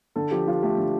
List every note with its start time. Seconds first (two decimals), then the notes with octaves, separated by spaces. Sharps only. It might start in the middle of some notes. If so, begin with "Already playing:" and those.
0.16 D3 A4
0.31 F3 G4
0.47 F3 F4
0.62 A3 G4
0.78 D3